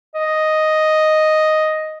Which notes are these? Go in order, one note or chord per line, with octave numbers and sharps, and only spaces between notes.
D#5